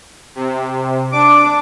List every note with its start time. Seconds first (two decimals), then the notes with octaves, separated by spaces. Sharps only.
0.35 C3
1.12 D4 D6